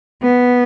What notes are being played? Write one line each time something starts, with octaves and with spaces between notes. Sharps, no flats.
B3